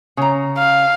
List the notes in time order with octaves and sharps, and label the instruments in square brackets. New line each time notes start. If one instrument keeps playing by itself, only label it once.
[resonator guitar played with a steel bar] C#3 A#5
[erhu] F5